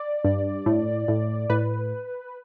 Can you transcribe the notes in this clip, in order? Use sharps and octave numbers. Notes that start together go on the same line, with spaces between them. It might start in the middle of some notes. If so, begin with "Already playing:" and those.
Already playing: D5
G2
A2
A2
A2 B4